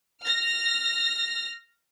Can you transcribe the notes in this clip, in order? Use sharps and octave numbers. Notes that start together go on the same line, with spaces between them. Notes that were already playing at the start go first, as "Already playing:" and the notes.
F6 A#6